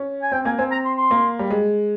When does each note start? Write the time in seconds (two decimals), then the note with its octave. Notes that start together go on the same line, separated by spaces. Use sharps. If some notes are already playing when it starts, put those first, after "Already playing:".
Already playing: C#4
0.22 G#5
0.32 C4 G5
0.45 A#3 G#5
0.59 C4 G#5
0.71 A#5
0.85 C6
0.98 C6
1.11 A#3
1.39 G3
1.50 G#3